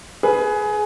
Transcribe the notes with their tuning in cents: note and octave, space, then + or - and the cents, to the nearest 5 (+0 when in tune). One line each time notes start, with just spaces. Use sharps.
G#4 +20 B4 +0